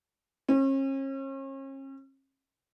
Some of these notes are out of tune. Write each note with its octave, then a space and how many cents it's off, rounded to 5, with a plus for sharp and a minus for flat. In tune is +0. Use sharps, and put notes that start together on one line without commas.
C#4 -40